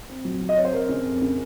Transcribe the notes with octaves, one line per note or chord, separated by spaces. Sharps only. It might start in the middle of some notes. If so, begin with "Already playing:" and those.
C4
F#3
F#3
D#5
C4 C#5
C5
C4 A#4
C#3
F2
C#3